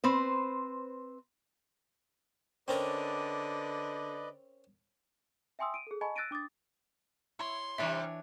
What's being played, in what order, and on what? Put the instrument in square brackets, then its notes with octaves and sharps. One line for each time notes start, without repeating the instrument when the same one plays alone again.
[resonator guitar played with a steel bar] C4 B4 C5
[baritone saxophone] D3 [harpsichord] C4 C#4 A#4 [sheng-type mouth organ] B4 D5 D#5
[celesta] E5 G5 G#5 C6 D#6 E6
D7 D#7
G#4 A4
D#5 G#5 A5 B5 C#6
E6 F#6 A6 A#6 D7 D#7
D4 D6 D#6 A6
[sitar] E4 [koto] C#5 [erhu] C6
[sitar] C3 G3 [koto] E3 D4 C#5 [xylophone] E5